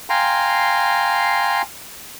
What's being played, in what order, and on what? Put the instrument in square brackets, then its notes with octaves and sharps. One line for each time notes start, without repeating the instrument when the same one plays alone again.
[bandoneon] F5 G5 G#5 A#5 C6